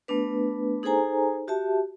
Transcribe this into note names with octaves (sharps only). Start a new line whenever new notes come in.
A3 B3 D4 B4
D#4 G#4 A4 C5 G#5 A#5
F#4 G4 E5 A5